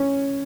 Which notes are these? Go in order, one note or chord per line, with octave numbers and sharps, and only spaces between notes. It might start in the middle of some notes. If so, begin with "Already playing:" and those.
Already playing: C#4